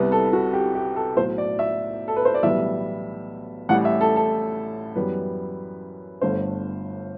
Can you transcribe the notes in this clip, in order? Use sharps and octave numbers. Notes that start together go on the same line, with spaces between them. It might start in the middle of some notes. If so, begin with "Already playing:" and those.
Already playing: C2 C3 G3 B3
A4
F#4
G4
G4
A4
B1 A2 F#3 C5
D5
E5
A4
B4
C5
D5
B1 A2 E3 G3 B3 E5
A1 A2 G3 F#5
E5
A4
A4
F#2 E3 G3 B3 B4
G1 G2 D3 A3 C5